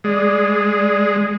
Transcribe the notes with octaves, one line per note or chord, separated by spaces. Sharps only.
G#3 D5